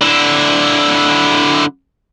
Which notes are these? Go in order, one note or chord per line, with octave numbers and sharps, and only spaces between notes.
D3 E4